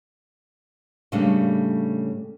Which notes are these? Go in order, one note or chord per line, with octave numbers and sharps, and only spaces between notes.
A2 C#3 G3 A3 A#3 D4